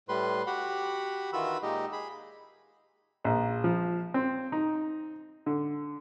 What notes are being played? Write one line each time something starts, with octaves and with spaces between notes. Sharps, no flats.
A2 G3 B4 C6
F#4 G4 F#5 B5
D#3 E3 F4 F#4 B5 E6
A#2 G#3 D#4 G4 D#5
G#4 B5
A#1
F3
C4
D#4
D3